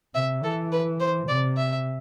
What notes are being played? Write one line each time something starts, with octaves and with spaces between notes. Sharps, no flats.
C3 E5
E3 A4
B4
C5
C3 D5
E5